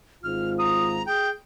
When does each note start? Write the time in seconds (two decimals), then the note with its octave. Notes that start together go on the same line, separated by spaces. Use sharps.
0.24 G#1 G#2 F4 F6
0.59 A#5 D#6
1.06 G#4 G5